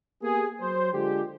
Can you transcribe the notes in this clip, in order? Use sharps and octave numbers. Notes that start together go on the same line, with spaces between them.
A#3 B3 G4 G#4
F#3 C5
D3 G#3 F4 G4